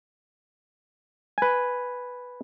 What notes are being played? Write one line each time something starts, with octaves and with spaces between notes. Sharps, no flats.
B4 G#5